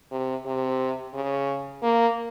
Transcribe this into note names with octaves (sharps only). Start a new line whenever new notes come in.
C3
C3
C#3
A#3